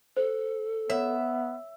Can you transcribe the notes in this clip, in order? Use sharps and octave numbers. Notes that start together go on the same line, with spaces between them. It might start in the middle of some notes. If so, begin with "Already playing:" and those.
A4 C5
B3 C#5 E5